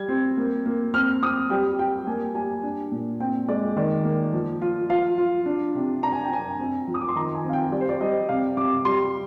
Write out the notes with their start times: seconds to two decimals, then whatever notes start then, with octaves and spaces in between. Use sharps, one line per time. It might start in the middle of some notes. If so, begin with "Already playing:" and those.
Already playing: G3 G#6
0.09 C4
0.37 A#3
0.66 A#3
0.94 C4 F6
1.23 C4 D#6
1.50 G3 G5
1.79 G3 G5
2.07 A#3 G#5
2.35 G3 G#5
2.63 D4
2.92 A#2
3.20 C4 G5
3.48 G#3 D5
3.76 D#3 D5
4.04 A#3
4.33 F3
4.62 F4
4.89 F4 F5
5.18 F4
5.46 D4
5.75 C3
6.03 D4 A#5
6.13 G#5
6.23 G5
6.31 D4 G#5
6.59 C4
6.88 F3
6.94 D#6
7.01 D6
7.09 C6
7.16 D#3 A#5
7.35 G#5
7.45 C4
7.50 F5
7.53 G5
7.72 G3 D5
7.81 C5
7.89 D5
8.00 G3 D#5
8.29 C3 F5
8.57 C3 D6
8.85 G3 C6